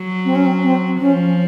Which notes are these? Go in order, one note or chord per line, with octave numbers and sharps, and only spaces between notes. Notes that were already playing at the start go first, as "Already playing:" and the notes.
Already playing: F#3
C4
C#4
C4
C4
F3 C#4